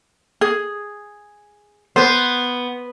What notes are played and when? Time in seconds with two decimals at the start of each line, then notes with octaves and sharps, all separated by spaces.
0.41 G#4
1.96 B3 B4 C5